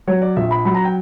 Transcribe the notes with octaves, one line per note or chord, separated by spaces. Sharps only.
F#3 C#5
D5
A#1 E5
B5
F#3 B5
A#5
G5